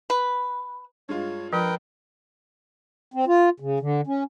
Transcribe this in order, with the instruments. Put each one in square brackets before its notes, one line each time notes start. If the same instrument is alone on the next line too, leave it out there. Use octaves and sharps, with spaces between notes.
[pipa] B4
[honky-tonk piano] G2 G#3 F4 [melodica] C#5
[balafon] F3 [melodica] A#4 B4 G5
[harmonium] C4
F4
C#3
D3
C#4